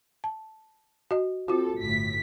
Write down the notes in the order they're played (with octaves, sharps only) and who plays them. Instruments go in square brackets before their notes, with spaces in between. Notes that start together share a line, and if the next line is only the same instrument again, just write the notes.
[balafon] A5
F#4 D#5
[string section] C4 A4 [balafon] F4 F#4
[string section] G1 A2 B6